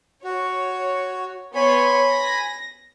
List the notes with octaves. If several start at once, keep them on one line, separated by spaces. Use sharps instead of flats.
F#4 C#5
B3 C#5 G#5 B5 C6
A#6